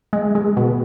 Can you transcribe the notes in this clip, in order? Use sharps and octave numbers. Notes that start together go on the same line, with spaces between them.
G#3
G#3
B2